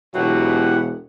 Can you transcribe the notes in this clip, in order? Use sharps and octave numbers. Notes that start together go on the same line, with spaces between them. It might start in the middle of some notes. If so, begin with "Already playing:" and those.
E1 B2 F#3 E4 G4 F#5